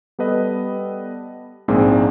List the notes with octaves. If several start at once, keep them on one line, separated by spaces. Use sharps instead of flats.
G3 B3 A4 B4 D#5
A#1 G#2 A#3 C4 D4 G#4